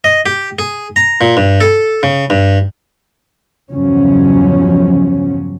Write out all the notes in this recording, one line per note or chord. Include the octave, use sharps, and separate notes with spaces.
D#5
G4
G#4
A#5
A#2
G2
A4
C#3
G2
E2 G2 C#3 F3 F#3 C#4